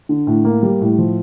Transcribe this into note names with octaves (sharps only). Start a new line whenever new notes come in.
D3
A2
A#3
G3
A2
F3